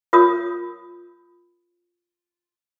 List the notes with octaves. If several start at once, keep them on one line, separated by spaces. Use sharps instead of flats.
F4 A#4 C#5 D#6